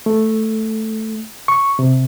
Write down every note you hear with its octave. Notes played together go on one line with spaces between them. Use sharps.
A3
C#6
C3